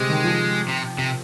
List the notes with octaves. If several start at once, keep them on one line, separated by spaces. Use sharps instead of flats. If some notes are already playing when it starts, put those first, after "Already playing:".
Already playing: C3 G#3
D#3
F3
C3
C3